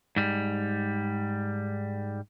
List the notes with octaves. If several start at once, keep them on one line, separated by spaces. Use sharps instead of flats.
G#2 G3